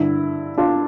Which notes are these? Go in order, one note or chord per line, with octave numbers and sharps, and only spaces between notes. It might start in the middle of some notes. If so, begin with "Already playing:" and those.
Already playing: G2 D3 E4
D4 F4